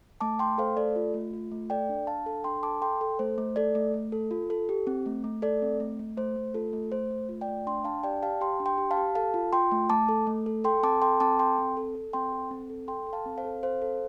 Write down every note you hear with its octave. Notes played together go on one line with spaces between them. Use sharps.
A3 A5 D6
A3 G5 C6
A4 C5 F5
A3 A4 D5
F4
A3
F4
A3
A4 D5 G5
D4
D4 F5 A5
A4
D4 G5 C6
A4 A5 D6
A4 G5 C6
A4
A3 C5
A3
A3 A4 D5
A3
A3
A4
F4
A4
G4
C4
A3
A3
A3 A4 D5
C4
A3
A3
A3 C5
A3
F4 A4
A3
A3 C5
A3
F4
D5 G5
A3
D4 G5 C6
D4 F5 A5
G4 D5 G5
G4 F5 A5
G4 G5 C6
D4
G5 C6
G4
F5 A5
G4
A4 F5 A5
F4
F4 G5 C6
A3
A3 A5 D6
A4
A3
A4
A4 G5 C6
C4 A5 D6
A4 G5 C6
C4 A5 D6
A4 G5 C6
C4
A4
A4
C4 G5 C6
A4
C4
A4
A4 G5 C6
A4
F5 A5
C4
C5 F5
A4
C4 C5 F5
A4